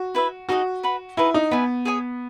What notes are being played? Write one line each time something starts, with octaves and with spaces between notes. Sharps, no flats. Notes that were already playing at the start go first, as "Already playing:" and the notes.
Already playing: F#4
E4 B4 E5
D#4 F#4 G#4 D#5 F#5
B4 F#5 B5
D#4 E4 G#4 B4 F#5
D#4
B3 B4 E5 G#5
G#4 C#5 G#5 D#6